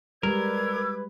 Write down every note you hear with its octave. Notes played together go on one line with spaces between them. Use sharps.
G3 G#3 A#4 B4 D6 E6 G#6